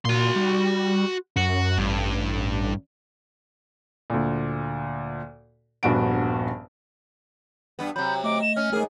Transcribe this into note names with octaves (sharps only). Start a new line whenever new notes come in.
A#2 F#4 C6
G3
F#2 F#4
A1 G2
D2 A#2
D#1 A#1 G2 B3 F#4 D7
G2 B3
C3 F#3 B5 G6
A3 D#5 D6
E7
C#4 F6
G#2 A3 G#4 A#4 G#5